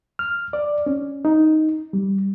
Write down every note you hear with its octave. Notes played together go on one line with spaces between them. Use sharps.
F6
D5
C#4
D#4
G3